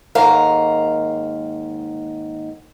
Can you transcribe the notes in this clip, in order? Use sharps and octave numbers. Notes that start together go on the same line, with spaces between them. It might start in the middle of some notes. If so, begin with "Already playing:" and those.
D#2 G#2 A#4 F5